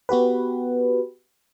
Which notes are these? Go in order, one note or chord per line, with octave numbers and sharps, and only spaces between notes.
B3 F#4 G4 B4